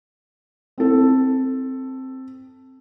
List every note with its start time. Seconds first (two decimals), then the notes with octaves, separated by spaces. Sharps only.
0.78 C4 A4